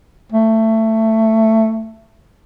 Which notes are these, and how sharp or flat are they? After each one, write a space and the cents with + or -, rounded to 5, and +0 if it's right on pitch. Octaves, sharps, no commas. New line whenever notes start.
A3 +15